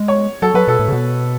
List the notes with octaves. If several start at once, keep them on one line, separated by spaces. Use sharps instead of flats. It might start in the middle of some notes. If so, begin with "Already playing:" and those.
Already playing: G#3
C#5
F#3 A4
F#3 B4
B2 A4
A2
C#3
B2